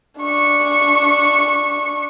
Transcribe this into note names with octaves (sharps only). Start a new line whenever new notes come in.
D4 C#6